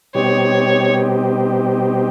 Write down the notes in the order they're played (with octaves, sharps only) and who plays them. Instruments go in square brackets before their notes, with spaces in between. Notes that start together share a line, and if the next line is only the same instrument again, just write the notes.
[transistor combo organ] B2 G3 C4 D#4 G4 [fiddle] C#5